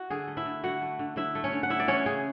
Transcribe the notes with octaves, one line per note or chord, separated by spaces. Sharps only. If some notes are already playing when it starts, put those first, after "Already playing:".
Already playing: E4 F#4
D3 G#4
A3
E4 E5
D3
D3 F#4 F#5
A3
D3
D3 E4 E5
A3
C#4 C#5
D3
F#5
D4 E4 E5
D5
E3 C#4 C#5
C#3 G#4